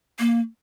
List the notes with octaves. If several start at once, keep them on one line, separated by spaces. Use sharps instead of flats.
A#3